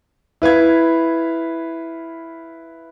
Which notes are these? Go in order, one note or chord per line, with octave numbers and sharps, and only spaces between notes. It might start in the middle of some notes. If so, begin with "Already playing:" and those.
E4 B4 F5 G#6